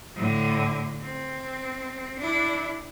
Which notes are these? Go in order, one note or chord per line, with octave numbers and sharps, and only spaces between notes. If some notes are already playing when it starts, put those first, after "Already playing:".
A2 D3
C4
D4 E4